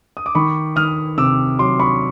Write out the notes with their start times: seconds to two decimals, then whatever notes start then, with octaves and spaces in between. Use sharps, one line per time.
0.17 D#6
0.26 D6
0.35 D#3 B5 C#6
0.76 D#3 D#6 F6
1.18 C3 D6 E6
1.59 F#3 C6 D6
1.80 B5 C#6